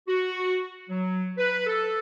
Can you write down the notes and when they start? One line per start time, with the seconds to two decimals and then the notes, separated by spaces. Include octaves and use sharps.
0.08 F#4
0.90 F#3
1.38 B4
1.66 A4